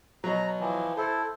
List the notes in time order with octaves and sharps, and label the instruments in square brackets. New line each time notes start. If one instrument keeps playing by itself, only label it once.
[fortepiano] B2 F#3 [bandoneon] A#5
[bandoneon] E3 F3
[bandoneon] E4 [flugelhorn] A4 [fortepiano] C5